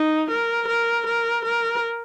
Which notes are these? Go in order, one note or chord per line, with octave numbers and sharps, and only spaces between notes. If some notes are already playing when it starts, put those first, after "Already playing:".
Already playing: D#4
A#4
A#4
A#4
A#4